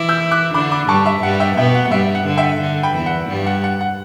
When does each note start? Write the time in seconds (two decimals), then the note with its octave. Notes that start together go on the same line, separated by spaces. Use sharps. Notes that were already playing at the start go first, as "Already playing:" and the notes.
Already playing: E3 E4 D6
0.09 E6 G6
0.31 D6 F#6
0.54 D3 D4 B5 D6
0.71 B5 D6
0.88 G2 G3 A5 C#6
1.06 E5
1.22 G2 G3 F#5
1.40 E5 G5
1.57 B2 B3 E5 G5
1.74 F#5
1.85 F#5
1.91 G2 G3 E5
2.15 F#5
2.27 D3
2.37 E5 G5
2.61 D3
2.83 G5 B5
2.94 E2 E3
3.06 F#5
3.29 G2 G3
3.46 F#5
3.64 F#5
3.81 F#5